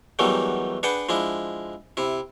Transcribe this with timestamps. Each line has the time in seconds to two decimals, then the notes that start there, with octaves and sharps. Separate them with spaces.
0.19 E2 D#3 E3 F#3 G3 A3
0.83 D4 G#4 B4 F#5 G5 A5
1.09 F3 G#3 D4 E4
1.97 C3 E4